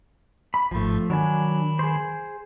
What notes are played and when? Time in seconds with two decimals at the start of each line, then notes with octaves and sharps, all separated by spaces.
0.54 B5
0.71 G#1 G#2 F3 A3
1.10 D#3 F#3 D4 G#5 B5
1.79 G#4 C5